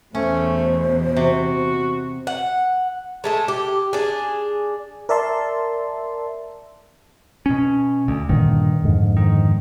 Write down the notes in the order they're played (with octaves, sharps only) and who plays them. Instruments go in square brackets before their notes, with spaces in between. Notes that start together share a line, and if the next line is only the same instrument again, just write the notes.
[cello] E2 B2 [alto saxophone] A3 [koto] C#4 [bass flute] C5
[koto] C3 [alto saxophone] F#4
[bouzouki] F#5
G#3 A3 A4
G4
D4 G#4
[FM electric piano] A#4 D5 E5 A5 C6
[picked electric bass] B2 C#4
D2
[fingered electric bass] G2 A#2 D3 [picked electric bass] D#3
[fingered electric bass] F2 G#2 D3
[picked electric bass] D#3